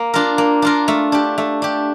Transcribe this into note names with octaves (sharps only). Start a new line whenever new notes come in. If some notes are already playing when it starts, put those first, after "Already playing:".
Already playing: A#3
D4 F4 A#4
A#3
D4 F4 A#4
A3
D4 G4
A3
D4 G4